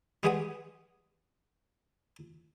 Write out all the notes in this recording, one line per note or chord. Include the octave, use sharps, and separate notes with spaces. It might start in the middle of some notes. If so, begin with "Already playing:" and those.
G3 G#3 G#4 B4 F#5 D#6